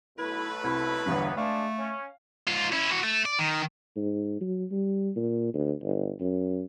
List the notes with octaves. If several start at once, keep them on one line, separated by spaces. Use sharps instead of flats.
B1 A3 E4 B4
C2 E4
G1 E2 G2 E3 A#3 B3
G#3 A3 D4 F5
C#4
G#2 F4
C#4 E4
E3 F#4
A3
D5
D#3
G#2
F#3
G3
A#2
D2
G1
F#2